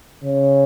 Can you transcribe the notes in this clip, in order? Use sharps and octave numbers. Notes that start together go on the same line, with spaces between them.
C#3